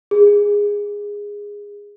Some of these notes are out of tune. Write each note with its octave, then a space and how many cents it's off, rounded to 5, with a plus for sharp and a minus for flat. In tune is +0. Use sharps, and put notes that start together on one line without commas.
G#4 -15